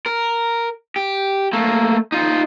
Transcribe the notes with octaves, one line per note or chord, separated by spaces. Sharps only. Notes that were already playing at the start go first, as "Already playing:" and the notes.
A#4
G4
A3 A#3
D#4 F4